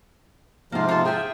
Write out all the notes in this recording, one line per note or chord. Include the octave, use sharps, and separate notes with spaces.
G#2 C3 F3 A#3 F4
F4 A4
G#4 E5 G5